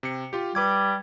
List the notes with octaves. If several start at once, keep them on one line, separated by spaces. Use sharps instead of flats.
C3 C#7
F4 G4
G3 B4 D6 G#6